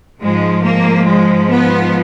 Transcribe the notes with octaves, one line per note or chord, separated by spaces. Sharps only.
G#2 F3 G#3
A#3
G#3
B3